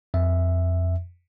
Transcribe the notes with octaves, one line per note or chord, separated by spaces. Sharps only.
F2 E5